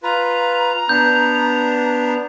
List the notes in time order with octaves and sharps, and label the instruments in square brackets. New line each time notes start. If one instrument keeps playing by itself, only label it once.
[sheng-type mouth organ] F4 B4 [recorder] A#5
[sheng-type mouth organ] B3 D4 [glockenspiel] G6